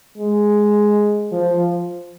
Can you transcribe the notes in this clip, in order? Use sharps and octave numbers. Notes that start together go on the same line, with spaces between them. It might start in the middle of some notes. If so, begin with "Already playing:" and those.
G#3
F3